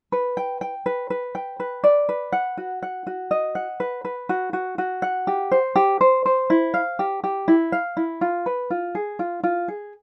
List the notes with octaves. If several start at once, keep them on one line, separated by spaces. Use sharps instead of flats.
B4
G5
G5
B4
B4
G5
B4
D5
B4
F#5
F#4
F#5
F#4
D#5
F#5
B4
B4
F#4
F#4
F#4
F#5
G4
C5
G4
C5
C5
E4
F5
G4
G4
E4
F5
E4
F4
B4
F4
G#4
F4
F4
G#4